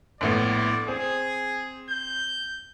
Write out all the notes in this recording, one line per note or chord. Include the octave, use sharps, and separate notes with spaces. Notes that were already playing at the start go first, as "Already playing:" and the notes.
A#1 A2 B3 D5
C4 G#4
G6